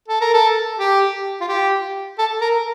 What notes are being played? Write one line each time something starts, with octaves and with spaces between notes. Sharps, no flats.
A4
A#4
A4
G4
F4
G4
A4
A#4